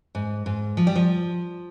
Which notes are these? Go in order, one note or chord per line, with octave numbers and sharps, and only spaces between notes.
G#2
G#2
F3
G3
F3